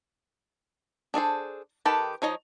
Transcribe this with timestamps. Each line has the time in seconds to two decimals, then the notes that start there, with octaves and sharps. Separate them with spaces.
1.14 D4 G#4 A4 C5
1.85 D#3 G4 A4 B4 A5
2.22 F3 D#4 C#5 D#5